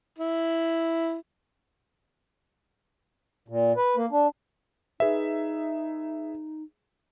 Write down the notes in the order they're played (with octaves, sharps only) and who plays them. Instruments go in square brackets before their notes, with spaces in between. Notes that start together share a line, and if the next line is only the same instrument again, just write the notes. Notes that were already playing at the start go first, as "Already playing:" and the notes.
[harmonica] E4
[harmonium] A#2
B4
A#3
D4
[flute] D#4 [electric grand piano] G#4 B4 E5